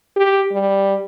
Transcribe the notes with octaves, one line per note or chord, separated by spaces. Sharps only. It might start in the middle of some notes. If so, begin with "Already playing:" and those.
G4
G3